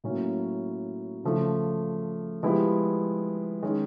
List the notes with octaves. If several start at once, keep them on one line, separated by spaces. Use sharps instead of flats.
A2 F#3 A#3 C#4
C#3 F3 A3
F3 G#3 B3 E4 G4
D#3 G#3 C#4